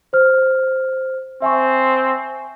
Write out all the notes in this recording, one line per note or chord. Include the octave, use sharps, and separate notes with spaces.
C5 F6
C4 E5 G#5 C#6